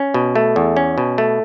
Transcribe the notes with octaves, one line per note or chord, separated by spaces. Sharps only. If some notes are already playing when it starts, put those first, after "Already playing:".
Already playing: C#4
B2
A3
E2
C#4
B2
A3